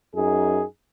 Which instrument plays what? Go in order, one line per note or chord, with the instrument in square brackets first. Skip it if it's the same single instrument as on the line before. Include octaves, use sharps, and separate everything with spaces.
[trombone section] F#2 D#4 G#4